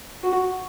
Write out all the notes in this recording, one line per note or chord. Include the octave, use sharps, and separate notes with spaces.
F#4